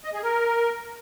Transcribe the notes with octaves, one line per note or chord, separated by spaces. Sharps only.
D#5
G#4
A#4